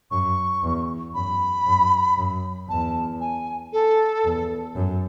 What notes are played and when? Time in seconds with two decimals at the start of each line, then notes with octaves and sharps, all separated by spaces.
0.11 F#2 C#6
0.63 E2
1.15 F#2 B5
1.66 F#2
2.18 F#2
2.69 E2 A5
3.20 G#5
3.73 A4
4.25 E2
4.75 F#2